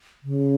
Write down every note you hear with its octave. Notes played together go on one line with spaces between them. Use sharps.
C#3